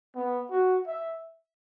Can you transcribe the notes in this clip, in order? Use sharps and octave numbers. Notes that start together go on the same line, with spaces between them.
B3
F#4
E5